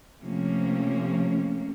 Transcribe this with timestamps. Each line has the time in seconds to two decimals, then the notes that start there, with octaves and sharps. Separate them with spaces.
0.21 C3 F3 A3 A#3 C#4